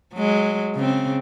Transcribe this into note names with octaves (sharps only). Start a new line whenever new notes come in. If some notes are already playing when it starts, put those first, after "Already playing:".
F#3 G#3
C#3 C4